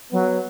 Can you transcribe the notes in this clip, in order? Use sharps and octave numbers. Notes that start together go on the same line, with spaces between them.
F#3 B3